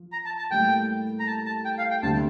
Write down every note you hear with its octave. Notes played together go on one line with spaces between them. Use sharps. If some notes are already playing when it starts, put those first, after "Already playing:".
Already playing: F3
A#5
A5
A5
A2 G3 A#3 G5
A#5
A5
A5
G5
F5
G5
D2 C3 G3 A5